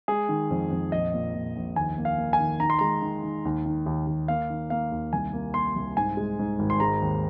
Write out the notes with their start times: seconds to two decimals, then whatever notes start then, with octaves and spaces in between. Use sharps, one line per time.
0.08 G#3 G#4
0.29 D#3
0.51 F2
0.71 F2
0.92 A#1 D#5
1.14 A#2
1.35 A#2
1.56 A#1
1.76 D#2 G#5
1.98 A#3
2.05 F5
2.18 A#3
2.33 G#5
2.40 D#3
2.60 D#3 A#5
2.70 C6
2.79 G#3 A#5
3.02 D#3
3.23 D#3
3.45 D#2
3.65 D#3
3.86 D#2
4.07 D#2
4.28 A#3 F5
4.50 D#3
4.70 A#3 F5
4.92 D#2
5.13 C2 G#5
5.33 A#3
5.54 A#3 C6
5.76 C2
5.97 G#2 G#5
6.17 G#3
6.39 G#2
6.59 G#1
6.70 C6
6.80 G#3 A#5
7.02 D#2